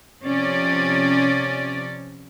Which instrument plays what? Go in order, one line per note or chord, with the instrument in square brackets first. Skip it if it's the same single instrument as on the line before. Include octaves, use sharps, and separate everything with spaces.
[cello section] C3 F3 C#4 D5